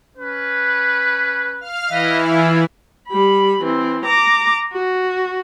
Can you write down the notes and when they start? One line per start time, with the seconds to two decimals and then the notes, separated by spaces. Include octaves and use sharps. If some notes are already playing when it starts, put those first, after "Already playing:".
0.17 C#4 B4
1.61 F5 F6
1.89 E3 E4 D#5 E5 F#5
2.35 F4 G#5 B5
3.09 G3 B5
3.63 E3 C4
4.05 A#5 D6
4.73 F#4